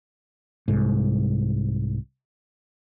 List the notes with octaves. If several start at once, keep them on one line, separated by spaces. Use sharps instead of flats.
C2 G#2